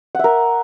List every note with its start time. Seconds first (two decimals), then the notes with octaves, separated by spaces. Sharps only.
0.15 F#5
0.19 E5
0.24 A#4